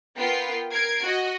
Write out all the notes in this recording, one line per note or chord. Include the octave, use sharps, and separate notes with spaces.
B3 F4 A#4 G5 C7
A#4 G#6 C7 D7
F#4 D#5